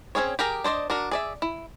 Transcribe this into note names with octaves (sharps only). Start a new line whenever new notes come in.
C4 C#4 G#4 C#5
G4 G#4 A#4 A#5
D4 C5 D5 D#5
D4 F#4 A#4
G#4 D5 E5
E4